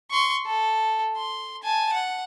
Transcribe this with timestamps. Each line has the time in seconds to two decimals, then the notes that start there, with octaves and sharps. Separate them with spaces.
0.11 C6 C#6
0.46 A4
1.17 C6
1.63 G#5 A5
1.93 F#5